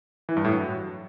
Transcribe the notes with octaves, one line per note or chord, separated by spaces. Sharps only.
E3
G2
A2
F#3